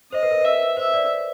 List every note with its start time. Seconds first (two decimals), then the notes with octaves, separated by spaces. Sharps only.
0.12 C5 D#5
0.23 B4
0.31 A#4
0.41 B4 E5
0.77 C5 E5
0.94 D5